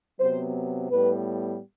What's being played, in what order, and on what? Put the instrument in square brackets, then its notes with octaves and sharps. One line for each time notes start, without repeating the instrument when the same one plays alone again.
[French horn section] C3 F#3 B3 C5
A2 G3 B3 B4